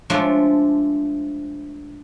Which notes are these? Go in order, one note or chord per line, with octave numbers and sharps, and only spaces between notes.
F3 G#3 A3 D4 D5